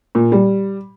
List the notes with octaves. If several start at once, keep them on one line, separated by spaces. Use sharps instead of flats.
A#2
G3